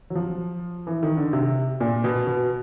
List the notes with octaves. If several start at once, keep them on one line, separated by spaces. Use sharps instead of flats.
F#3
F3
E3
D#3
D3
C3
A#2
B2
B2